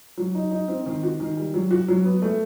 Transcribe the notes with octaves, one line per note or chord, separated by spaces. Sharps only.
F#3
D#4
D#4
C4
D#3
F#4
D#3
G3
F#3
F#4
F#3
B3
A3